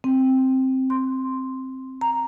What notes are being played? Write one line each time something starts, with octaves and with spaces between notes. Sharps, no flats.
C4
C6
A#5